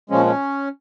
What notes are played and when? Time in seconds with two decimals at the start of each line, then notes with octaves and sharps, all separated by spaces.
0.10 A#2 F3 G#3 C#4
0.26 C#4